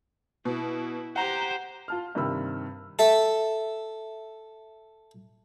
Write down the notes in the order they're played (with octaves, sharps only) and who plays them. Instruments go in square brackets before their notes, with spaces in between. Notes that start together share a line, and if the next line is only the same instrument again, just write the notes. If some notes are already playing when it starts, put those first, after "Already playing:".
[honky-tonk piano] B2 [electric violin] E4
[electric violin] G4 C5 [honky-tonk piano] F#5 A#5
[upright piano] F4 A5 F6
G2 C3 D#3 G4 B5 E6
[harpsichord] A4 E5